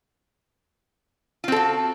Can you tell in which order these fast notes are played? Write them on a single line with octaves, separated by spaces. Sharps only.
F4 C4 A4 F#4